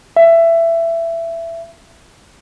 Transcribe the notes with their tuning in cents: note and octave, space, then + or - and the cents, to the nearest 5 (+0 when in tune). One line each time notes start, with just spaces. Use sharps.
E5 +15